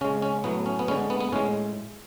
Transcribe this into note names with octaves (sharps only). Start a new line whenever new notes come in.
C#3 G#3 C#4
C#4
A2 F#3 A3 B3
C#4
B3
D3 G#3 C#4
B3
B3
A2 G#3 C#4